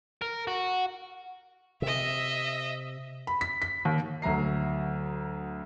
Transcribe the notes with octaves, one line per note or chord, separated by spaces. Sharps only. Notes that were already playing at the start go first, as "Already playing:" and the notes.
A#4
F#4
C3 D#5 E5
B5
B6
B6
D#2
D2 F#3 E5 A#5 C7